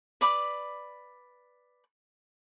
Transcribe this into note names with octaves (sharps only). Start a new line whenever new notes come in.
B4 D5 B5 D6